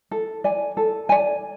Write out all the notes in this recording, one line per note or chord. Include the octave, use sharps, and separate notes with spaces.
A4
D5 G#5
A4
D5 G#5